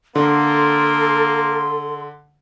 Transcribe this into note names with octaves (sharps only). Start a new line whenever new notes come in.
D3 A#3 A4 C6